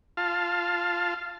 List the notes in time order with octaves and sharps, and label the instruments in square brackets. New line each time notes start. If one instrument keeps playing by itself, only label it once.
[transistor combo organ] F4 F5 A5